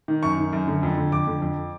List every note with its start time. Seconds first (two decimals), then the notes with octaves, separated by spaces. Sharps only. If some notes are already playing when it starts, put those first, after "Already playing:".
0.08 D#3
0.23 F#2 C#6
0.38 D#3
0.53 F#2
0.68 D3
0.83 F2
0.98 D3
1.12 F2 D6
1.27 D3
1.42 F2